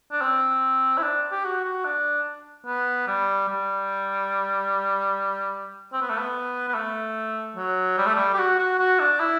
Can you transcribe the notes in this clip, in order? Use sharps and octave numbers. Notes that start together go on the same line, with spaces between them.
D4
C4
E4
D4
G4
F#4
F#4
D4
B3
G3
G3
C4
B3
A3
B3
B3
A3
F#3
G3
A3
G3
G4
F#4
F#4
F#4
D4
E4